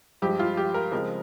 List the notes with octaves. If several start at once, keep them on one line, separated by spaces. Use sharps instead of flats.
G2 F3 G#3 G4
F4
G4
A#4
C#3 F3 G#3 C4 A#4